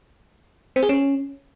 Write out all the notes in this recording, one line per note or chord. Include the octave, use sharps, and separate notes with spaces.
C4
G#4
C#4